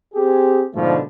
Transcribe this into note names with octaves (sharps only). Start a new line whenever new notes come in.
C4 G4 G#4
G#2 B2 D3 F3 A3